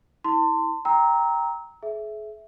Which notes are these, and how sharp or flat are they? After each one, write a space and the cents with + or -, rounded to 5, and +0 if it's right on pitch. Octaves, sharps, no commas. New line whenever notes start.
E4 -25 A5 +35 C6 -15
G5 +0 A#5 +0 E6 -30
G#4 +40 E5 +0